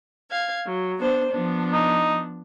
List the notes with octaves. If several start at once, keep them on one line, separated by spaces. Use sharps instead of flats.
F5 G#6
F#3
B3 D4 C5
F3 B3 D4
D#4